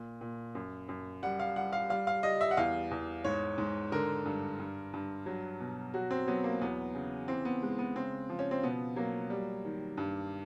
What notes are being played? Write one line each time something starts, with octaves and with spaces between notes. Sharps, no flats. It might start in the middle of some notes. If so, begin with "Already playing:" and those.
Already playing: A#2
A#2
F#2
F#2
G3 F#5
F5
G3 F#5
F5
G3 F5
F5
G3 D#5
E5
F#5
E2 F5
E2
G#2 C#5
G#2
D3 A#4
G2
G2
G2
F#3
B2
F#3 F#4
C4
F#3 B3
A#3
E2 B3
C#3
E3 C4
B3
G#3
B3
C#3 C4
F3
C#4
C4
B2 B3
F#3 A#3
G3
D#3
G2